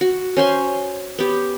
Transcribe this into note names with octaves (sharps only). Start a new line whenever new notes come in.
F#4
C#4 C5 G#5 C6
B3 G4